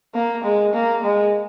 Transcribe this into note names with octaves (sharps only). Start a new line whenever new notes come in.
A#3
G#3
A#3
G#3